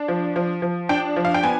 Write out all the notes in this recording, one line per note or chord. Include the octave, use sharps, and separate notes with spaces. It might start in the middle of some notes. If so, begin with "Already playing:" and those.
Already playing: D4
F3
F3
F3
D4 G5
F3
F5
G5
B3 G#5